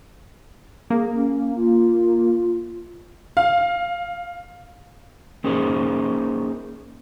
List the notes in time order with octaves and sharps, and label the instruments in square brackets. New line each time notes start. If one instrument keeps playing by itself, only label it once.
[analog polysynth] A#3 [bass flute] G#4
[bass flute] C#4
F4
[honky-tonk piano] F5
[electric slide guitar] A#3 C#4 D#4 G#4 A#4 C5